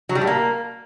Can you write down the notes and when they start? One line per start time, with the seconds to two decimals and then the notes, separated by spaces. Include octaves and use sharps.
0.09 F#3
0.15 G3
0.21 A2
0.27 A#3